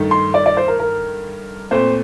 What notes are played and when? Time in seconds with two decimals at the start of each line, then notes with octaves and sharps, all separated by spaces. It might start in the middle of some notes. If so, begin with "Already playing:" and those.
Already playing: G2 D#3 A3
0.11 C6
0.34 D5
0.46 D5
0.57 C5
0.68 A#4
0.80 A#4
1.71 A#2 A3 C4 C5